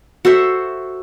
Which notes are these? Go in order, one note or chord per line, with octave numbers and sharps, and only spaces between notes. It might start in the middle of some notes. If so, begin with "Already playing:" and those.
F#4 A4 C5 E5